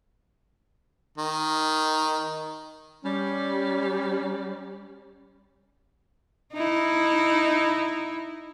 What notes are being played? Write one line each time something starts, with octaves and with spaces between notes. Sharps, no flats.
D#3
G3 C#4
D#4 E4